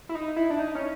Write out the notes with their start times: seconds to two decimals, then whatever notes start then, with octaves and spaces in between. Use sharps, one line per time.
0.09 E4
0.15 D#4
0.36 E4
0.50 D4
0.59 D#4
0.75 C#4